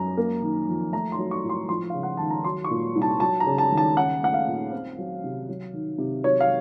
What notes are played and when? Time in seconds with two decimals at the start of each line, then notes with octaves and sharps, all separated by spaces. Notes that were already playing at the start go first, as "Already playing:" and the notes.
Already playing: F#2 A#5
0.17 A#3
0.42 D#3
0.68 F2
0.93 A3 A#5
1.12 C6
1.18 F#3
1.31 C#6
1.44 A2
1.49 C6
1.69 F3 C6
1.90 C#3 F5
2.03 F#5
2.17 D#2 A5
2.30 A#5
2.44 F#3 C6
2.64 C#6
2.70 A#2
2.95 C2
3.02 A5
3.20 F#3 A5
3.40 A#5
3.46 C#3
3.58 A5
3.72 D#2
3.77 A5
3.97 C#4 F#5
4.22 A3 F#5
4.34 F5
4.47 A#2
4.72 C4
4.98 F#3
5.24 C3
5.49 F#3
5.73 D#3
5.98 C3
6.24 F#3 C#5
6.40 F5